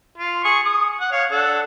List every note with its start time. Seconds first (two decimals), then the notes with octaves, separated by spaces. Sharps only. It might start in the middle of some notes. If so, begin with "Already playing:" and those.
0.18 F4
0.44 G#4 C#6
0.65 D#6
1.01 F#5
1.12 C#5 F5
1.31 D4 A4 F#5